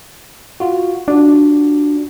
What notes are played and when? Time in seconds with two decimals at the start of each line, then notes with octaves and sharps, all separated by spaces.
0.60 F4 F#4
1.08 D4 F4 F#4